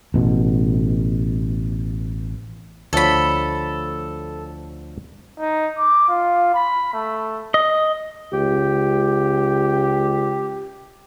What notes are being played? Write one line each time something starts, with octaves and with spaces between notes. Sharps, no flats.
A1 B2
D2 F3 A4 C#5 B5
D#4
D6
F4
B5
A3
D#5
C#2 G4